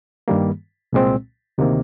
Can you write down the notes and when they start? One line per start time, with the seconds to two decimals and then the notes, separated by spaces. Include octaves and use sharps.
0.28 G2 D#3 G3 A#3
0.93 C2 A#2 G#3 C4
1.58 D2 C3 D#3 A#3